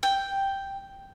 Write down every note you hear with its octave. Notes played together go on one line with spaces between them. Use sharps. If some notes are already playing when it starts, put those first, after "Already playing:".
G5